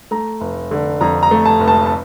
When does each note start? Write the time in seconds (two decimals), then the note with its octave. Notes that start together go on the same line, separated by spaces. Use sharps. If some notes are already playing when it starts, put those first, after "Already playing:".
0.11 A3 A#5
0.41 F1
0.71 D3
1.01 F2 A#5
1.23 A#5
1.31 A3
1.46 A5
1.60 F1
1.68 A5
1.86 A5